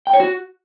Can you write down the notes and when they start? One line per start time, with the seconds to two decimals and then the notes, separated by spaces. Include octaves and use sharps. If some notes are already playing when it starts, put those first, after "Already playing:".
0.07 G5
0.13 C#5
0.20 F#4